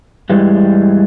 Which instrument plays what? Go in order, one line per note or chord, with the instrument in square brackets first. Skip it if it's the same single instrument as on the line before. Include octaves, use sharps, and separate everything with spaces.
[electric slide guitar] G2 E3 G3 G#3